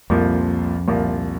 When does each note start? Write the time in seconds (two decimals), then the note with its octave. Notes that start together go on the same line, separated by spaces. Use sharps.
0.10 C2 F2 A#2 F3 A#3
0.88 C2 A#2 F3 A#3